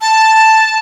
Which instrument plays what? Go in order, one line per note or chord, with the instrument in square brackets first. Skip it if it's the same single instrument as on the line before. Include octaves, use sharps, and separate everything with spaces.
[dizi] A5